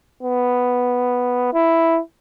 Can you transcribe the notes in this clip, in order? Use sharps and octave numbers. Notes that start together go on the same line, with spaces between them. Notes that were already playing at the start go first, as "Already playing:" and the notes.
B3
E4